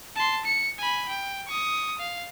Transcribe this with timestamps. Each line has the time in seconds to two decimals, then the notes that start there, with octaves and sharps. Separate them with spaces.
0.16 A5 C6
0.45 C#7
0.78 G#5 B5
1.09 G5
1.46 C#6 D#6
1.99 F5